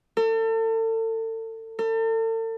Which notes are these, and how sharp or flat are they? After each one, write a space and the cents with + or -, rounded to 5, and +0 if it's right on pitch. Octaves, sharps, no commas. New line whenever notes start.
A4 +35
A4 +40